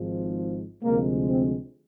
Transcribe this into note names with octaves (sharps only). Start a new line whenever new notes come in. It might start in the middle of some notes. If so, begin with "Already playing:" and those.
Already playing: G#1 G#2 F3 G#3
D2 C3 F3 G#3 A#3
C4